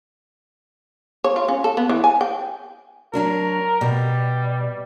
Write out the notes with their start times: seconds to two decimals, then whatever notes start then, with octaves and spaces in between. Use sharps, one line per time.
1.24 C#5
1.36 F4
1.48 C#4
1.64 A4
1.77 B3
1.89 E3
2.04 G#5
2.21 G5
3.13 F#3 D4 F#4 A#4
3.81 B2 G3